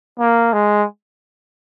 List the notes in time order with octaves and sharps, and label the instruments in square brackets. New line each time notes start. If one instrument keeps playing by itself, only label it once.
[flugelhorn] A#3
G#3